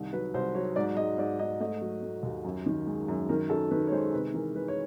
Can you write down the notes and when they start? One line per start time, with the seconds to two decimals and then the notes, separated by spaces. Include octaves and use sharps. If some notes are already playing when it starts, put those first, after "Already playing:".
Already playing: C2 D#3
0.13 F#3 B4
0.34 C2 C5
0.55 F#3 C#5
0.76 G#2 D5
0.97 G#2 D#5
1.18 G#2 D5
1.39 G#2 D#5
1.60 A3 D#5
1.81 F#3
2.02 A3
2.23 D#2
2.44 F#2
2.66 D#3
2.87 G#3
3.08 F#2
3.29 D#3 A#4
3.49 F#2 A4
3.71 D#3 B4
3.87 C#5
3.91 G#3 C5
4.13 C3 B4
4.34 E3 A#4
4.55 G#3 B4
4.68 C#5